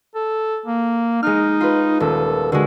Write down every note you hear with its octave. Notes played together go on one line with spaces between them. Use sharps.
A4
A#3
G#3 D#4 F6
F4 B4
D#1 A4
D3 G#3 F#4